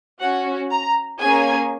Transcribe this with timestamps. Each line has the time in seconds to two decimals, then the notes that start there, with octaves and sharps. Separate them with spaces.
0.20 C#4 F#4 F#5
0.71 A#5
1.20 A#3 C#4 G#4 G#5